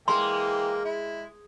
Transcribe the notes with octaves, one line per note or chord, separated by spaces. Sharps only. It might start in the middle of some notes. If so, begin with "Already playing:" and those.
E3 G#3 A#3 G5 C6
E4